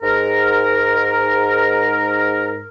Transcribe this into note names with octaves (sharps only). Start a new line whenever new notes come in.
G#2 A#4